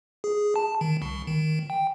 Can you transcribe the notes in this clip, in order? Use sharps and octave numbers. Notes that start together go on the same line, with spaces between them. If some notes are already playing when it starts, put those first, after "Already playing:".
G#4
A5
D#3
C2
D#3
G5